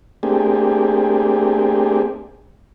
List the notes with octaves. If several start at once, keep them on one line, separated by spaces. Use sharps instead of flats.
A3 A#3 C4 D4 G4 G#4